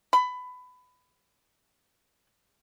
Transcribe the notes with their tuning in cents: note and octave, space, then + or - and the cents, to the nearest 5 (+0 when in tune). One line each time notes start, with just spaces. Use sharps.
B5 +20